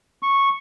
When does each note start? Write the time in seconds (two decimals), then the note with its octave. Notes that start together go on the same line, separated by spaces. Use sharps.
0.23 C#6